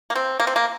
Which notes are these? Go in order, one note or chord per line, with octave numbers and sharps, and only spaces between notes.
A#3
C4
A#3
C4
A#3